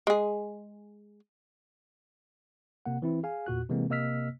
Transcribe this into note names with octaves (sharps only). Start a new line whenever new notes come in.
G#3 G#4
C3 A#3 F#5
E3 C4 E4
G#4 F5 G#5
E2 A#2 F#4 F#6
C3 E3 G#3 A#3 C4
C3 A#3 D#5 E6 F6 B6